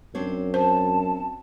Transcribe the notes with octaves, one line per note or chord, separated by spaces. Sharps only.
F#2 C4 D4 C#5
C5 A5